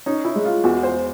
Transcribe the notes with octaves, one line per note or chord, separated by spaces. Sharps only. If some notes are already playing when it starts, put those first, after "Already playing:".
C#4 D#4
E4
G#3
F4
E2 F#4
C5